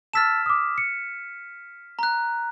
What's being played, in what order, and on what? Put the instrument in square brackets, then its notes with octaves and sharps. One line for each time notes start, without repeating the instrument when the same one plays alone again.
[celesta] A5 E6 A6 [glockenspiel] F6 B6 E7
[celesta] D6 D#6
C#7
[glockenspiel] A#5 F#6